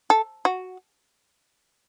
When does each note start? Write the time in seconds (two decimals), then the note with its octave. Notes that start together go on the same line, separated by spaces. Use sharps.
0.10 A4
0.45 F#4